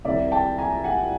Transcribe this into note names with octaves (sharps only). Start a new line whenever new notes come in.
C2 C3 D#3 D5 E5
G5 A5
G#5 A#5
F#5 G#5